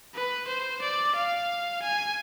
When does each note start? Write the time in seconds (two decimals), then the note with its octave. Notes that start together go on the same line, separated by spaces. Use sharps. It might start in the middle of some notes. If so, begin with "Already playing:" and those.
0.15 B4
0.48 C5
0.81 D5
1.16 F5
1.82 G#5